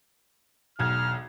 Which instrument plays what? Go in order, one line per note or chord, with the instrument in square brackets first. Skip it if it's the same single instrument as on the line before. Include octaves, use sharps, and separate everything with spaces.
[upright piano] E1 B1 G#6 [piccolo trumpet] F6